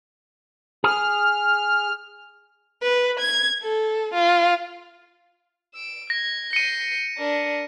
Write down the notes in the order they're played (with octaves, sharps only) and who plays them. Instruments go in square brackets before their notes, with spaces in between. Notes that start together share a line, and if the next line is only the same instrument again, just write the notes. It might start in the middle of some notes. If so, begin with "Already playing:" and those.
[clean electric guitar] G#4 [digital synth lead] F6
[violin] B4
G#6
A4
F4
E6 D7
[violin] G#6 [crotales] A#6
[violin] G6 C7 [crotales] C#7 D#7
[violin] D4 A#4